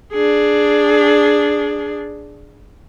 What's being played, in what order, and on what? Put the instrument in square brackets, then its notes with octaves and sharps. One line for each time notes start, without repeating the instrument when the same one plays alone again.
[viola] D4 G#4